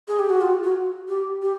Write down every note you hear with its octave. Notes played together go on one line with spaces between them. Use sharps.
G#4
G4
F#4
F4
F#4
G4
G4